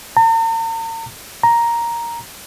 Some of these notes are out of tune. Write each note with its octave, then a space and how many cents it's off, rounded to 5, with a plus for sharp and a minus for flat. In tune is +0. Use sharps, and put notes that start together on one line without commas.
A#5 -45
A#5 +5